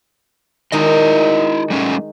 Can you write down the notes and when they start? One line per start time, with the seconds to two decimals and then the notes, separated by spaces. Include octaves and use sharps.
0.72 D#3 G#3 D#4 E4 F#4 D#5
1.70 G3 A3 C#4